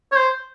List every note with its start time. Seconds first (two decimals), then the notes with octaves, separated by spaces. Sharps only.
0.12 C#5
0.16 C5